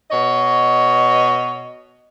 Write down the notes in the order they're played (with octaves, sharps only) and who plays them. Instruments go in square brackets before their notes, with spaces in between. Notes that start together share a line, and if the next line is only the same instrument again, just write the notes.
[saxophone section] B2 C#5 D#5